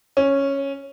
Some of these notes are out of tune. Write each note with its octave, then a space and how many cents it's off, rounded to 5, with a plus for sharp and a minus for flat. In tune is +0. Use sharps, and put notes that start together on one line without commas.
C#4 -5